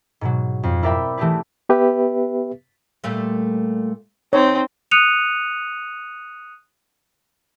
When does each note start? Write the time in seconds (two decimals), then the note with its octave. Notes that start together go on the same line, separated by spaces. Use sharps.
0.21 G#2 B2 F#3
0.63 F2
0.83 E4 A#4 D5 E5 G5 B5
1.18 E3 A3 C4 G4 G#4 B4
1.69 B3 G4 B4 E5
3.04 A#2 G3 A3
4.33 D#2 C4 D#4 C#5
4.91 D#6 F#6 C#7 D#7 F7